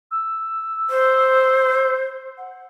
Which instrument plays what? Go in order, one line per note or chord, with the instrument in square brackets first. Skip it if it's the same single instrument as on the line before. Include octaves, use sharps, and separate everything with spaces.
[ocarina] E6
[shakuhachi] C5
[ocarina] F#5